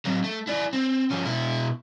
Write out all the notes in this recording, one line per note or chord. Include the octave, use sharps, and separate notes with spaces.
F#3 C4
A3
E4 D5
C4
F3 C#4
B2 E4